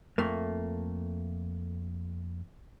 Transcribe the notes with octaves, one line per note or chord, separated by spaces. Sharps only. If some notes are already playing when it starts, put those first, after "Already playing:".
F2 A3 A#3